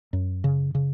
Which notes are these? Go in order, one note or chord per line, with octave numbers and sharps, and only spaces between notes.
F#2
C#3
C#3